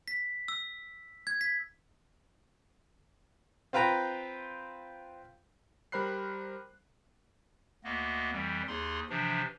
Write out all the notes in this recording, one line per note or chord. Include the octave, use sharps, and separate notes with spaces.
B6
E6
G#6
B6
C4 F4 B4 G5 A#5
G3 A#4 C5 B5 F#6 C7
D2 A#3 B3 D#5
F2 E3 G3
D#2 D#4 G#4 C6
C3 E3 F3 D4